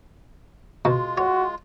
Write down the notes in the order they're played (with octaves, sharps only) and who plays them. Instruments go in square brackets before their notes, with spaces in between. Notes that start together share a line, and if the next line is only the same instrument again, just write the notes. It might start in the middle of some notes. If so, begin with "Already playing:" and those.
[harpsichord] B2 [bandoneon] G#3 F4
[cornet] F#4 [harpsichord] C#5